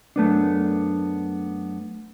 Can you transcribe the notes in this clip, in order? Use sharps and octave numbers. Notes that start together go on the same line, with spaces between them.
F#2 A3 B3 D4